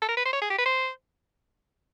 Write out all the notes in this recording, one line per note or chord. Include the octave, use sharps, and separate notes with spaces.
A4
A#4
B4
C5
C#5
G#4
G4
B4
C5